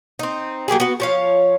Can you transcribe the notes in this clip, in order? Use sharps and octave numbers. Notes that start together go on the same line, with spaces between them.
C4 D#4
F#3 A#3 G4 G#4
B3 F#4
F3 C#5 F5